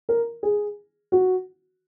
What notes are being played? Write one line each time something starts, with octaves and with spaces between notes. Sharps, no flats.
A#4
G#4
F#4